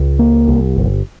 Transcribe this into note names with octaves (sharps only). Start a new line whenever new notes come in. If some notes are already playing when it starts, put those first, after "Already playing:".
Already playing: C#2
A#3
C2
G1